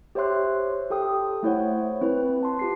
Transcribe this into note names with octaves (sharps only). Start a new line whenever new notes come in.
G4 C5 C#5 E5 C6 F#6
G4 A4 G5 D#6
A3 E4 C5 C#5 F#5
C4 E4 B4
A5 C6
F4 G4 C7